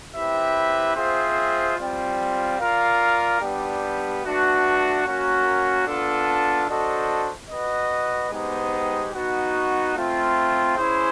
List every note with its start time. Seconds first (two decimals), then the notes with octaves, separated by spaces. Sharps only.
0.13 C4 E4 G4 B4 E5
0.95 C4 F4 G#4 C5 E5
1.77 G3 C4 F4
2.58 F4 A#4 D5 F5
3.40 G3 B3 D4 G4
4.22 A3 D4 F#4 B4
5.04 A#3 C#4 F#4 A#4
5.85 B3 D4 F4 A4
6.67 D4 F#4 A4 C5 D#5
7.49 F#4 B4 D#5
8.30 G#3 B3 D#4 G4 C5
9.12 B3 D#4 F#4
9.94 A3 C4 F4
10.76 C#4 E4 G#4 C5